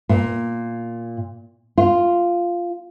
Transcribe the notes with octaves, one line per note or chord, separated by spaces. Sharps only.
A#2
F4